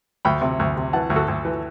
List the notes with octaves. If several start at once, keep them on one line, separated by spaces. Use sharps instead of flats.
D2 G5 B5
C3
D2
C3
E3 F#5 A5
D2
F#4 A4
D2
E3